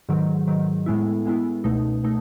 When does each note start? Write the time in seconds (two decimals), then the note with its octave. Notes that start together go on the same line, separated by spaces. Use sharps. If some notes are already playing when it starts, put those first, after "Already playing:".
0.09 G#2 D#3 F#3
0.47 G#2 D#3 F#3
0.86 A2 G#3 B3 E4
1.25 A2 G#3 B3 E4
1.64 C#2 B2 A3 D#4
2.04 B2 A3 D#4